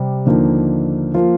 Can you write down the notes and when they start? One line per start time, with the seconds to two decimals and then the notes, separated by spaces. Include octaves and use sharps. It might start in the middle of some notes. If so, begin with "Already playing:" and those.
Already playing: C3 G3
0.25 D#2 D3 F3 A#3 D#4
1.14 F3 A#3 F4